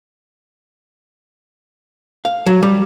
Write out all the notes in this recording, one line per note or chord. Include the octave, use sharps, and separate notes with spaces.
F5
F#3
G3